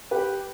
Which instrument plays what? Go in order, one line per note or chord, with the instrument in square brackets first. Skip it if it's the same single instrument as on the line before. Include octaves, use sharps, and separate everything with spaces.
[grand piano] G4 B4